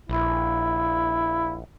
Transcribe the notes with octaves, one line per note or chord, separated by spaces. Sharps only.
A#1 E4